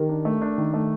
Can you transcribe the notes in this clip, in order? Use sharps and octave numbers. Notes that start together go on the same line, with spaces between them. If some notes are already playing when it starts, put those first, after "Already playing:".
Already playing: D#3 G4 A#4
D4
A3
D4
D#3
A3